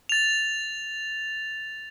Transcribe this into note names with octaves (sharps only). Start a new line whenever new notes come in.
A6 F7